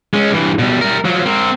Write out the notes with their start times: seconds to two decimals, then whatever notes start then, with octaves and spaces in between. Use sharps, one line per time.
0.14 G#3 C#4
0.30 G2 E3
0.59 B2 G3
0.81 G3 A#4
1.05 F3 F#3
1.26 C4 A#4